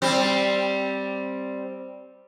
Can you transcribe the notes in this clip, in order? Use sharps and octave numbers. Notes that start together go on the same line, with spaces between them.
G3 C4